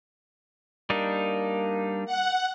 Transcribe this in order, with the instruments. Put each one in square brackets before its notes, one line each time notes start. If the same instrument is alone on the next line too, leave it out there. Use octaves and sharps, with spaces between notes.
[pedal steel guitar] G3 D4 D#4 [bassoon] A#3
[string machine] F#5